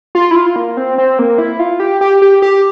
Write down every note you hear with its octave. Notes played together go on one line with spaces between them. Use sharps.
F4
E4
F4
A#3
C4
C4
A#3
E4
F4
G4
G4
G4
G4